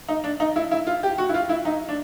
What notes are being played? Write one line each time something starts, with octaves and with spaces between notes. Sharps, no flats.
D#4
D4
D#4
E4
E4
F4
G4
F#4
E4
F4
E4
D#4
D4